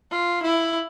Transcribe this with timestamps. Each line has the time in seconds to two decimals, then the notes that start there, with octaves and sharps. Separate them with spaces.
0.11 F4
0.42 E4